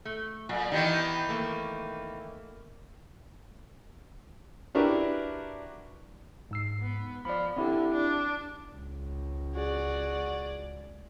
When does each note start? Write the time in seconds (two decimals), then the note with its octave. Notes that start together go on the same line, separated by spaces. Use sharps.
0.05 A3
0.49 A#2 F#3
0.72 D#3 E3 B3 G4 D#5
1.29 A3 A#3
4.75 D4 E4 F#4 G4 A#4 B4
6.51 G#2 E6 C7
6.81 B3
7.25 F3 D5 B5
7.56 D3 C4 E4 G4
7.93 D4
8.73 C#2
9.55 F#4 G#4 D5